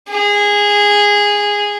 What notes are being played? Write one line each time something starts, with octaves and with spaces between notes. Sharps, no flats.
G#4